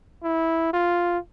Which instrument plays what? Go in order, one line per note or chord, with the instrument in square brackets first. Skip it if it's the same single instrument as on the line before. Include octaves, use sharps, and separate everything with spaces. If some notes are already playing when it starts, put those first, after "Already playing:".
[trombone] E4
F4